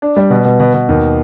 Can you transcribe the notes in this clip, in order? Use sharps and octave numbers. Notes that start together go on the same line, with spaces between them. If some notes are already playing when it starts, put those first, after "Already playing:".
D4
G3
B2
B2
B2
B2
D#2